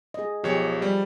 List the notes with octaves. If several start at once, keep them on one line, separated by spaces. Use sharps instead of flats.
G#4 D#5
B1 F3 G4 G#4 C#5
G3